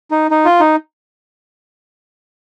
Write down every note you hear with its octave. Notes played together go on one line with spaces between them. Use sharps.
D#4
D#4
F4
D#4